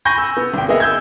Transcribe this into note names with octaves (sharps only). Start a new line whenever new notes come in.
G#5 B5 C#6 G6 A#6
E6
B3
G#1 G5
A#3 B3 G#4 D#5 E5
E6 G6 G#6